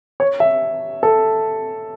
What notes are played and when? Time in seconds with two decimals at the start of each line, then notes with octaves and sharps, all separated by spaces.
0.20 C#5
0.40 E5
1.03 A4